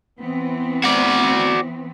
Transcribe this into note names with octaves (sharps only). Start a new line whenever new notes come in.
E3 B3 C4
F#4 D5